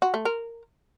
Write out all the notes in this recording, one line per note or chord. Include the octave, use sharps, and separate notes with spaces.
F#4
A3
A#4